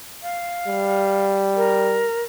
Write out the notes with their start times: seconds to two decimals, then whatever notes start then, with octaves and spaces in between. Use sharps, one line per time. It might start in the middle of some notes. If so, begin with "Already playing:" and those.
0.23 F5
0.67 G3
1.56 A#4